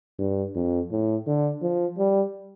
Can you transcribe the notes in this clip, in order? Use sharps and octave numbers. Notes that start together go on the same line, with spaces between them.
G2
F2
A2
D3
F3
G3